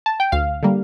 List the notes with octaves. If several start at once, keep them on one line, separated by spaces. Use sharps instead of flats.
A5
G5
D2 F5
D3 G3 A#3